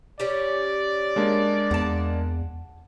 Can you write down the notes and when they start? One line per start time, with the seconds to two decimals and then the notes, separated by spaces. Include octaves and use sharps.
0.20 G3 C#4 D5
1.16 G#3 A#3 D4
1.71 E2 F#5 A5